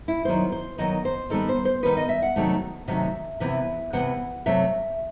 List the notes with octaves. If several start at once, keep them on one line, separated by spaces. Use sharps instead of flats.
E4
D#3 F#3 B3 C5
C5
D#3 F#3 B3 D#5
C5
D#3 G3 B3 A4
C5
C5
D#3 G3 B3 B4
D#5
E5
F#5
C3 D#3 F#3 A3
C3 D#3 F#3 A3 E5
C3 E3 B3 E5
C3 E3 B3 F#5
C3 F#3 A3 E5